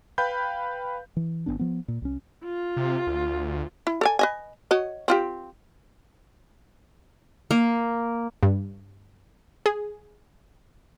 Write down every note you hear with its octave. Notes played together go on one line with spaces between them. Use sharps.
B4 F5 G5 B5 G6
E3
G#1 G#2 B3 D4
F3 B3
A#2
C2 C#4
F4
C3
D2
E4
A4 D5 G#5
B4 D#5 G#5
F#4 C#5 D#5
C4 F4 G4
A#3
G2
G#4